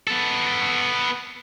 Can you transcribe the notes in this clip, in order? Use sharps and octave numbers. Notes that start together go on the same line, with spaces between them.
B3 A4